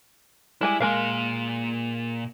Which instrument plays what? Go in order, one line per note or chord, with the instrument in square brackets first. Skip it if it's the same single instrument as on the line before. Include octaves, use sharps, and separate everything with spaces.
[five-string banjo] G3 G#3 G#5 [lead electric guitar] E4
[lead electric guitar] A#2 C6 [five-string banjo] G#3 A#4 F5